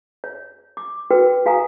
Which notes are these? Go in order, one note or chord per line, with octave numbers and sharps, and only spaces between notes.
C#5
D6
F#4 A#4 B4 G5
F#4 F5 G#5 A#5 D#6